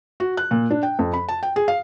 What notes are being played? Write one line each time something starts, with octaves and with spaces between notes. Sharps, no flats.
F#4
F#6
A#2
D4
G5
F2
B5
A5
G5
G#4
F5